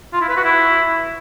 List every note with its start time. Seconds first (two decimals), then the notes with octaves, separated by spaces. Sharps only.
0.13 F4
0.21 E4
0.29 B4
0.36 F#4
0.44 E4